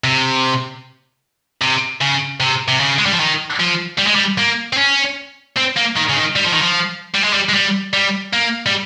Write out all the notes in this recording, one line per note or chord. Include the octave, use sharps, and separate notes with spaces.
C3
C3
C#3
C3
C3
C#3
G#3
G3
F3
D#3
F3
G3
G#3
G3
A#3
C4
C#4
C4
A#3
D#3
C#3
D#3
G3
F3
D#3
F3
G3
G#3
G3
G#3
G3
G3
A#3
G3